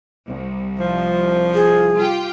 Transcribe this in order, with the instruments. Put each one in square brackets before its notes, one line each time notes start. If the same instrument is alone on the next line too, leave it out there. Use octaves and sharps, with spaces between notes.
[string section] C2
[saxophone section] F3
[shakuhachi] G#4
[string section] F4 G4 G5